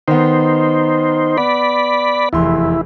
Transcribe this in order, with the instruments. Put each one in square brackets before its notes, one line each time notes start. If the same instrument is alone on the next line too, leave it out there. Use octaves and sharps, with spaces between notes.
[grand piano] D#3 B3 [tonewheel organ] D#4 C5
[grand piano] B3 [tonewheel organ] D5 B5
[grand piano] F1 E2 C6 [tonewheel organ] E4